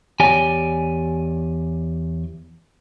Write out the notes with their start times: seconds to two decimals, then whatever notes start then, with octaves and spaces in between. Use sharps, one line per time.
0.20 E2 G4 C#5 D5 G#5